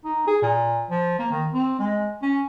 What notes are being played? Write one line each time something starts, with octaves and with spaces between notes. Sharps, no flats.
D#4
G#4
A#2
F3
A#3
D#3
C4
G#3
C#4